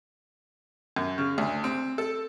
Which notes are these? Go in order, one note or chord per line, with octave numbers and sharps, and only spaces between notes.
F#2
C#3
D2
C4
A4